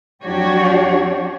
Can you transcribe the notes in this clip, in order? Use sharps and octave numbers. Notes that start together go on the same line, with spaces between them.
F2 F#3 D4 F#4 G4 C#5